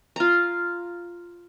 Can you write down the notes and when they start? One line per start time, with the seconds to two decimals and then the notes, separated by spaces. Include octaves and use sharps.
0.16 F4 A#5